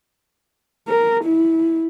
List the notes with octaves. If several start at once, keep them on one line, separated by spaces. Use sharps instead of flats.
A#4
E4